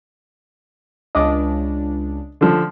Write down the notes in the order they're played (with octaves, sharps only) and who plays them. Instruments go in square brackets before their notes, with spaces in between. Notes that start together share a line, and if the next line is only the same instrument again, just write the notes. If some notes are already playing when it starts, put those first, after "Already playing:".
[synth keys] C#2 D4 [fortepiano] D#5 D6
[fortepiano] D3 F3